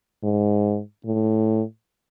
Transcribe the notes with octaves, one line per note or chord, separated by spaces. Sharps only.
G#2
A2